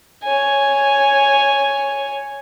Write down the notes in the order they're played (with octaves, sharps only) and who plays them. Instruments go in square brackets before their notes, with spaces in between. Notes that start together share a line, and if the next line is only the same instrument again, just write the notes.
[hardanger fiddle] C#5 G#5